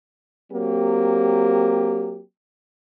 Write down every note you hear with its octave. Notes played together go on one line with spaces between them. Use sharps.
F#3 A#3 C4 G4